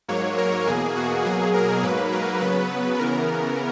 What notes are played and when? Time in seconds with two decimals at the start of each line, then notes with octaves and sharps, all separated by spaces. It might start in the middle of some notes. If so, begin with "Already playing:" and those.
0.08 G#2 F#3 A#3 C#5
0.38 A#4
0.67 E2 B2 A#3 G#4
0.96 F#4
1.25 B2 F#3 A#3 G#4
1.54 A#4
1.82 G#2 F#3 A#3 B4
2.12 A#4
2.41 C#3 F#3 B3 B4
2.99 C#3 E3 B3 A#4